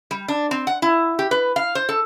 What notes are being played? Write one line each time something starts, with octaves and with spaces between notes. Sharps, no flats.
G3
D4
C4
F#5
E4
G4
B4
F5
C5
A4